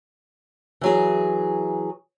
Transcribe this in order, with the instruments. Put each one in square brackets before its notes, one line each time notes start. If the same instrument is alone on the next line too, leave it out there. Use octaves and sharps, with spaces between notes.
[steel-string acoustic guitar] E3 F#3 G#4